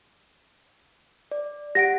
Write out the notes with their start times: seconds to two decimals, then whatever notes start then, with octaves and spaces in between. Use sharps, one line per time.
1.31 D5
1.75 G4 F#5 A#6 D7